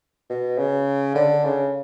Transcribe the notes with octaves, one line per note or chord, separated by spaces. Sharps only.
B2
C#3
D3
C#3